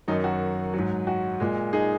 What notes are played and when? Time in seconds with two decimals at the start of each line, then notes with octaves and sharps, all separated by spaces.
0.08 F#2 D#3 F#3 D#4
0.24 F#4
0.74 G#2 F#3
1.07 F#4
1.40 A#2 G#3
1.73 D#4 G#4